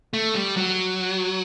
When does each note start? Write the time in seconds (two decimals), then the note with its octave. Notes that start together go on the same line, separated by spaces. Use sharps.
0.13 A3
0.35 G3
0.57 F#3